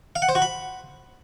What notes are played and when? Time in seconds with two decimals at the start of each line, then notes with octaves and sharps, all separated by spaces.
0.16 F5
0.22 F#5
0.29 C5
0.35 F#4
0.42 B5